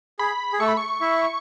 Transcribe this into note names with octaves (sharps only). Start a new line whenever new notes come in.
G#4 B5
G#4
A3 A4 C#6
B5
C#6
E4 E5